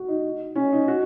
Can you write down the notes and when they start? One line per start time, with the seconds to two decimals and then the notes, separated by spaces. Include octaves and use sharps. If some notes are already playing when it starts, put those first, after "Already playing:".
Already playing: F#4
0.08 D#4
0.55 C#4
0.72 D#4
0.88 F#4